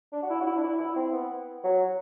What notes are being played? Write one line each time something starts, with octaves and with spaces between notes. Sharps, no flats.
D4
F#4
E4
F#4
E4
D4
E4
E4
C4
B3
F#3